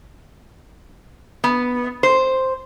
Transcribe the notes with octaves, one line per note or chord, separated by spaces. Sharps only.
B3
C5